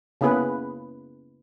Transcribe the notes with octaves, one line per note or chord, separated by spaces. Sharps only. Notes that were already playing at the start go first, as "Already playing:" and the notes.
C#3 A#3 B3 E4 G#4 B4